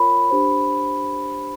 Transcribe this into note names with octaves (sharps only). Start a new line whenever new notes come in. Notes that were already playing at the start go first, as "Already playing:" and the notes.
Already playing: F4 A#4 C#5 B5
D4 G4 C5